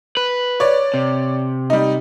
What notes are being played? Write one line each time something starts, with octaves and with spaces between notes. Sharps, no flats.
B4
C#5 D5
C3
G3 D#4